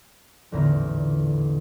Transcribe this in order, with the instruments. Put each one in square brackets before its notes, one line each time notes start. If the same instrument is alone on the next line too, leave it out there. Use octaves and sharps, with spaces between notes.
[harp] D#1 A1 E2 D3 E4 A#4